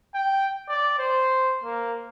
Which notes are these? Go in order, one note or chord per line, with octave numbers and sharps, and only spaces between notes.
G5
D5
C5
A#3